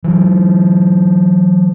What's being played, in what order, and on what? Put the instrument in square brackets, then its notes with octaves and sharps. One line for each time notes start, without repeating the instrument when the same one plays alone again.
[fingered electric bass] E3 F#3